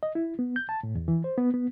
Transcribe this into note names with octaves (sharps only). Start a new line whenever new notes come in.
D#5
E4
B3
G6
A5
A2
E2
E3
C5
B3
B3